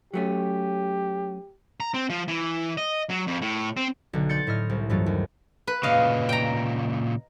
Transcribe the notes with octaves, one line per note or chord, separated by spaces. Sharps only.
F#3 A3 C#4 G4
A#5
C4
F3
E3
D#5
F#3
F2
A2
C4
B1 D3
D5 C6 G6 A6 C#7
A2 E4 D#5 F6
C2
G2 E3 F#3 A3 F4
D#2
B4
A#2 C#3 D#5 F5
G5 A#5